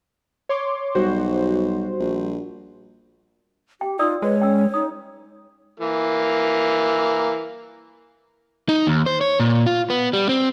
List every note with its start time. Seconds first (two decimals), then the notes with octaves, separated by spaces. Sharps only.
0.49 C#5 C6 D6
0.95 B1 G3 F#4 C5
2.00 A#1
3.81 G4 G5
3.99 D#4 F4 D5 D#6 E6
4.22 G#3 B4 C#5
4.41 C#4 G5 E6
4.74 D#4 D#6
5.80 E3 A#3
8.69 D#4
8.87 D#2
9.06 C5
9.21 C#5
9.40 A#2
9.66 F4
9.90 B3
10.13 G3
10.29 C4